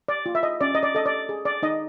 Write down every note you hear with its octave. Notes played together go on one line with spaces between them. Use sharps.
D5
F4
E5
D#5
C#4 D5
D#5
D5
A4 D#5
D5
G#4
D5
D#4 D#5